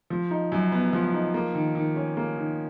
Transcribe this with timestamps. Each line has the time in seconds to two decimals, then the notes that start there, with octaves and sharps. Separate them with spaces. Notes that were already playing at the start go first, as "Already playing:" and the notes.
0.10 F3
0.31 D#4
0.52 F#2
0.72 B3
0.93 F3
1.13 D#4
1.34 A#3
1.55 D#3
1.75 D#3
1.96 C#4
2.17 A#3
2.37 D#3